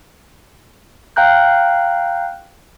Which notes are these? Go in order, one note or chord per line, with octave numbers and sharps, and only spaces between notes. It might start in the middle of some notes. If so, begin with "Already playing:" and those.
F5 G5 A#5 F#6 G6